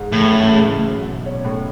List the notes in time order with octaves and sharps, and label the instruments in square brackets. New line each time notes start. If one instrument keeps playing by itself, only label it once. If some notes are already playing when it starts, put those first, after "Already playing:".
Already playing: [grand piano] G#2
[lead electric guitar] A2 [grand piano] E3
[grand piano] F#2
G#3
C#3
F#3
B1
C#4
A2